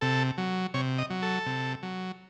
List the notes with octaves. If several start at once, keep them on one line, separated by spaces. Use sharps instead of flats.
C3 A4
F#3
C3 C#5
D#5
F#3
A4
C3
F#3